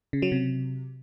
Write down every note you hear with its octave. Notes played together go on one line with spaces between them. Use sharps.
C#3
F#3
C3